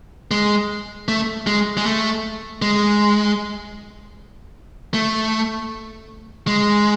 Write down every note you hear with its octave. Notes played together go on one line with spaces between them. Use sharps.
G#3
A3
G#3
G#3
A3
G#3
A3
G#3